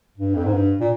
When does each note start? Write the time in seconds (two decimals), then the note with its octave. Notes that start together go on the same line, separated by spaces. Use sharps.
0.18 G2
0.35 F2
0.45 G#2
0.53 G2
0.81 A#2